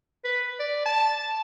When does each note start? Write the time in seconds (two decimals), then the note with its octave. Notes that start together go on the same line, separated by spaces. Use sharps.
0.24 B4
0.59 D5
0.85 A5